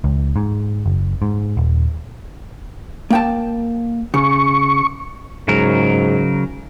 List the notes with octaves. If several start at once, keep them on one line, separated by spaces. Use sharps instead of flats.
C#2
G#2
F#1
G#2
D#1
A#3 G5 A5
C#3 C#6
G#2 C#3 F#3 A#4